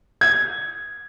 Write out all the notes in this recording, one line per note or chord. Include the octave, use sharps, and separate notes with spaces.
G#6